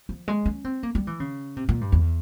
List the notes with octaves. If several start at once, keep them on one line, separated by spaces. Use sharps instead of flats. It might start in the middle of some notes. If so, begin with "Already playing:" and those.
F3
G#3
C#4
C4
A#3
G3
E3
C#3
C3
A#2
G2
E2